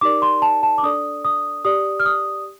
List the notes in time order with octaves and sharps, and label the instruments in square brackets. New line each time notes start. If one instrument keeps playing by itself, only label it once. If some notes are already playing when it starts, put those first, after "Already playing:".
[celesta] D#4 G4 A#4 D5 D6
C6
A5
A5
D6
D4 A4 D5 D#6
D#6
G4 D5 D#6
F6
D#6